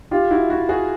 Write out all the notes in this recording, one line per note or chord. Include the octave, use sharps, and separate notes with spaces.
F4 G4
E4 F#4
E4 F#4
F#4 G#4